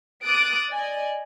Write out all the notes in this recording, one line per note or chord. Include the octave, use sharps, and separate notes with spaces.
D6 D#6 F#6 A6 D7
D5 D#5 G#5